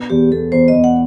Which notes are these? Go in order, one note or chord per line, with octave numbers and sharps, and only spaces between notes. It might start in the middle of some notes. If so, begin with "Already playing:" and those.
Already playing: B2 B3
E2 G4
E2 A4
E2 C5
D#5
E2
F#5